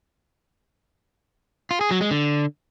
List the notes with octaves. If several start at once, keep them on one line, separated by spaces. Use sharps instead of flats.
F4
G#4
F#3
G#3
D3